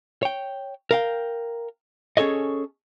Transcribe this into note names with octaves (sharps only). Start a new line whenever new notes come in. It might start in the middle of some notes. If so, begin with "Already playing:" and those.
C#5 G5
A#4 F5 G5
C#4 G#4 A4 C#5 D#5